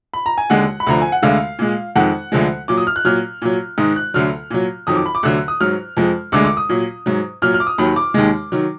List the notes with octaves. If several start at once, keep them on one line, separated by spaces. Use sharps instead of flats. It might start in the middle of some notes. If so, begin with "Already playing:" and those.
B5
A#5
G#5
D#2 D3 G#3 F#5
B5
D2 D3 F3 A#5
G#5
F#5
D2 D3 G#3 F5
A#2 G#3
F2 D#3 G#3 F#5
D2 D3 F3 G#3
A#2 F#3 D6
D#6
F6
F#6
A#2 F#3 F6
A#2 F#3
G#2 D#3 G#3 D#6
F#6
D2 D3 F#3 F6
A#2 F#3
F2 D#3 F#3 D#6
D6
B5
D6
D2 D3 F#3 F#6
D#6
G#2 F#3 F6
F2 F3 G#3
D2 D3 G#3 D6
D6
D#6
A#2 F#3
G#2 F#3
A#2 F#3 F6
F6
D6
D#6
D#2 D#3 F#3 B5
D6
D#2 D#3 G#3
D#3 F#3